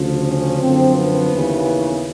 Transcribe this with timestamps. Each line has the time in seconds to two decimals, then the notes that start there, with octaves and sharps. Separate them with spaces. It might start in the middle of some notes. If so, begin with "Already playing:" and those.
Already playing: D2 C#3 F3
0.26 C#4
0.61 F#2 D3 F3 C4
0.97 B3
1.32 D#2 C#3 E3